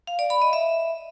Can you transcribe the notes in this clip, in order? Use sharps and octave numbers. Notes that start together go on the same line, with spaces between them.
F5
D5
B5
D#5
E5